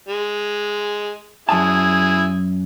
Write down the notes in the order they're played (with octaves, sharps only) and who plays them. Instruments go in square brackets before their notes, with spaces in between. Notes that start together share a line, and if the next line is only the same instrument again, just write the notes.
[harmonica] G#3
[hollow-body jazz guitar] F#2 A5 [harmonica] E4 G#4